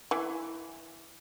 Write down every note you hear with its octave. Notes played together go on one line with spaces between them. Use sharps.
E3